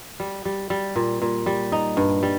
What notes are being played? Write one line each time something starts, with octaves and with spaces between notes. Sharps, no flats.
G3
G3
G3
A#2
A#2
G3
D#4
G2
G3